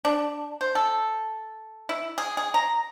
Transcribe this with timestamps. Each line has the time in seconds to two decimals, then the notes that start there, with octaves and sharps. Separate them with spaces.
0.05 D4
0.61 C5
0.75 A4
1.89 E4
2.18 G#4
2.37 G#4
2.54 A#5